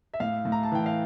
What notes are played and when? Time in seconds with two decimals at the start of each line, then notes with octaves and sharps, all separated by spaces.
0.14 E5
0.20 A2 F5
0.45 A2
0.52 A#5
0.63 A5
0.72 E3 G5
0.86 F5